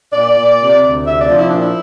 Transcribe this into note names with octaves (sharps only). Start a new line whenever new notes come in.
A#2 D5
A#2
C3
D2
C3 E5
D5
F3
E4
A#2 D4
E4